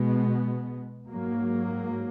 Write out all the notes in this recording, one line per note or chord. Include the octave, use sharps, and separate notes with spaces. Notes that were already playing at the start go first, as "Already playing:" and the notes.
Already playing: B2 G#3 B3
G#2 F#3 A#3